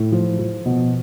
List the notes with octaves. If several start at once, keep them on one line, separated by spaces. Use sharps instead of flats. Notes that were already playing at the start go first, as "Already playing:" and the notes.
Already playing: A2
F3
F3
B2